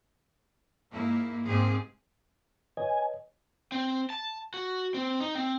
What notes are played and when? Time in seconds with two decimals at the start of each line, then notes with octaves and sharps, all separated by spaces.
0.91 G#2 A#3 E4
1.46 G#2 C3 A#3 C4 G4 G#4
2.77 B4 C#5 D#5 G#5
3.72 C4
4.10 A5
4.54 F#4
4.94 C4
5.20 D#4
5.35 C4